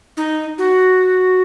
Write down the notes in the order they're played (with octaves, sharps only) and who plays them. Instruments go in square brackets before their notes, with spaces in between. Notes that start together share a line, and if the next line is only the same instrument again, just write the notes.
[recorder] D#4
F#4